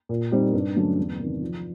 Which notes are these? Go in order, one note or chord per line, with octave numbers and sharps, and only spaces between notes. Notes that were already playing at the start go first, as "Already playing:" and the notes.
A#2
G3 C4 D#4
G2
D3 F#3 A3 C#4
E2
C3 D#3
F3